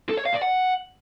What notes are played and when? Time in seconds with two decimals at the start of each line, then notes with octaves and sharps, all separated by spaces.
0.09 A4
0.17 C#5
0.26 F5
0.34 D5
0.42 F#5